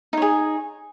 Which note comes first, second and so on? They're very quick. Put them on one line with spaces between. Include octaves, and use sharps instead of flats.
D#4 C#5 G#4